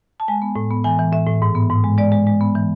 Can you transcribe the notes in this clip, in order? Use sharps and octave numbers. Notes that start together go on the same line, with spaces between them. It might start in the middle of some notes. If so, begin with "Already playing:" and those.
A5
G#3 G#5
B3
A2
B3
E3 G#5
E3
A2 E5
A2
G#2
B3
G#2
G#3
G#3 D5
G#3
G#3
B3
E3